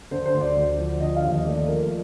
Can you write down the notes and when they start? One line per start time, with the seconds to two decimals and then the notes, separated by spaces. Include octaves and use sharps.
0.11 D3 C5
0.26 C5
0.34 D2
0.41 D5
0.56 D2
0.78 F3
1.00 D3 D#5
1.16 F5
1.24 D#2
1.32 D#5
1.45 A3 D5
1.68 F3 A#4